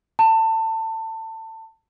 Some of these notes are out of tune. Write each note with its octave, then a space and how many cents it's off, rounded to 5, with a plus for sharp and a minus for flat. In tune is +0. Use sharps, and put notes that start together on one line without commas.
A5 +25